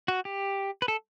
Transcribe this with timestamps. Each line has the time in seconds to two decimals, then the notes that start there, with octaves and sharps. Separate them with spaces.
0.08 F#4
0.25 G4
0.82 B4
0.88 A4